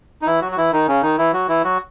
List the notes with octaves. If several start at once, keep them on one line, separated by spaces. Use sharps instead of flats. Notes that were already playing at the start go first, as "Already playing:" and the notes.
D#4
E3 E4
F#3 F#4
F#4
E3 E4
D#3 D#4
C#3 C#4
D#3 D#4
E3 E4
F#3 F#4
E3 E4
F#3 F#4